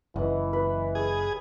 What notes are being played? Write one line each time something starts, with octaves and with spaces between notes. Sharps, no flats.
F#1 E3 B4 D#5 F#5
B4
G#4